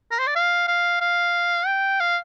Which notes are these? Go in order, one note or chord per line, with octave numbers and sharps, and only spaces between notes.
A#4
C5
D5
F5
F5
F5
G5
F5